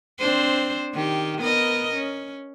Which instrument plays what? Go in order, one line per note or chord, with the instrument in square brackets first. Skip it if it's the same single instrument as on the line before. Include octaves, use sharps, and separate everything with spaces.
[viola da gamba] C4 D4 C5
D#3 G4
B3 A#4 D#5
C#4